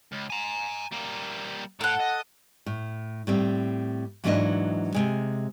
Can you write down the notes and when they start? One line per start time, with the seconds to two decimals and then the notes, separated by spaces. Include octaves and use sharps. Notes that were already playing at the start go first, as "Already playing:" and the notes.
0.12 C#2
0.30 G#5 A#5
0.93 G3 A#3
1.81 A2 A4 F#5
2.01 D#5
2.66 A2
3.27 A2 G3 C4
4.24 G#2 E3 F#3 A#3 D4 D#5
4.94 C3 G#3